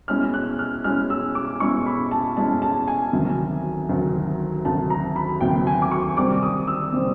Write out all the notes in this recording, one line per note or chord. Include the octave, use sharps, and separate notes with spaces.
B2 G#3 C#4 E4 F6
F#6
F6
B2 G#3 C#4 E4 F6
E6
D6
B2 G#3 C#4 E4 C#6
B5
A5
B2 G#3 C#4 E4 A5
A5
G#5
D2 C3 D#3 F#3
D2 C3 D#3 F#3
D2 C3 D#3 F#3 A5
A#5
B5
D2 C3 D#3 F#3 G5
G#5
D6
C#6
C3 D#3 G3 C4 D6
D#6
E6
C3 D#3 G3 C4